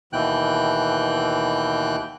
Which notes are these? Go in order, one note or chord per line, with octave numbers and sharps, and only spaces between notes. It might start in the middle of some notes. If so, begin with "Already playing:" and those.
D#2 B2 E3 G5 F#6